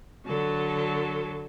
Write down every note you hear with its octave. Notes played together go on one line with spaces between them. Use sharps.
D3 F#3 A4